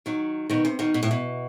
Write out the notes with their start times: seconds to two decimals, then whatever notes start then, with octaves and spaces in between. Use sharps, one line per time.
0.06 D#3 F#3
0.50 B2 D#3
0.65 C3
0.79 B2 D#3
0.94 B2
1.03 A2
1.11 B2